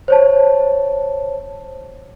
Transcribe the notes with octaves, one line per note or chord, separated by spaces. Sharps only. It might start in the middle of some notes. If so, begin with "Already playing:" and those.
C5 C#5 A5